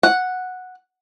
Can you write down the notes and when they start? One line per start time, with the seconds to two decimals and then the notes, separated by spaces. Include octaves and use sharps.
0.03 F#5